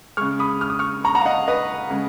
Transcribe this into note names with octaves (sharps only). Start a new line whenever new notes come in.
C#3 G#3 C#6 F6
B5 D#6
F6
D#6
C#6 F6
A#5 C#6
F#5 A#5
F5
D#5 F#5
B4 D#5
C#3 G#3